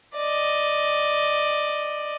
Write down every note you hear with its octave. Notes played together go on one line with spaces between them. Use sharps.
D5 D#5